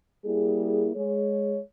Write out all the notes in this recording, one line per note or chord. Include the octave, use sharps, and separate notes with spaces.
G3 A#3 E4 G#4
G#3 G#4 C#5